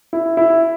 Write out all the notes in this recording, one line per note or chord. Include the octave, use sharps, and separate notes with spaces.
E4
E4